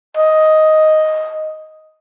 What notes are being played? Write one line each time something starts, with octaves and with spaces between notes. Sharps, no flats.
D#5